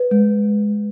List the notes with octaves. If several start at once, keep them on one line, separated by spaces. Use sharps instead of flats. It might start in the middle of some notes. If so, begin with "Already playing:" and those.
Already playing: B4
G#3